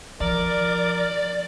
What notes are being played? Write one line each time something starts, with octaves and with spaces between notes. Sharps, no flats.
F3 A#4 D5